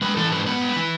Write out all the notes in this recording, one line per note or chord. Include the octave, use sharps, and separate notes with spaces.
G#3 B4
E3 A4
G#2 B4
B3 B4
G#3
E3